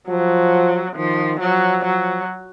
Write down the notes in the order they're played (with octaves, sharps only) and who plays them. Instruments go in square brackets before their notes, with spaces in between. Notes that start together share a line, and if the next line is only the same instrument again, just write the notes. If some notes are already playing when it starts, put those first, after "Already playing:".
[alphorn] F3 [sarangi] F#3
[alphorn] D#3 [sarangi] F3
[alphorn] F3 [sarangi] F#3
[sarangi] F#3